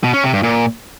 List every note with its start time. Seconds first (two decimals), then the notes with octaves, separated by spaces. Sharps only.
0.04 B2
0.14 C#4
0.23 C3
0.33 G2
0.43 A#2